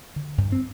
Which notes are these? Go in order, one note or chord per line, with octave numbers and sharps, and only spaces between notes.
D3
G2
C4